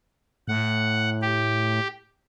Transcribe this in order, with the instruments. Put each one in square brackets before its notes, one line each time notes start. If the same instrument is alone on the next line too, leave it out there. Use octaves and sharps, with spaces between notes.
[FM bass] A2 [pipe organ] F#5
[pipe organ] G4